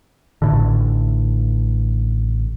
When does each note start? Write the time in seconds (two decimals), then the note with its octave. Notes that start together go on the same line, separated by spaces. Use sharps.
0.42 A1 A2 D3